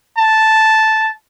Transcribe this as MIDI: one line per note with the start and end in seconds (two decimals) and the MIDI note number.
0.18 1.11 81